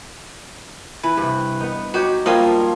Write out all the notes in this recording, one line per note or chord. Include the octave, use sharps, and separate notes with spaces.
E3 B4
G2 C3
B3 D#4
F#3 D#4 F#4 G4
F3 G3 A#3 D#4 F4 B4 C#5 D#5